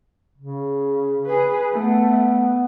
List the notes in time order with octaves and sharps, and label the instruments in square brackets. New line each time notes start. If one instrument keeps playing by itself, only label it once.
[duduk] C#3
[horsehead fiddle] G#4 B4
[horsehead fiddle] A3 [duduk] B3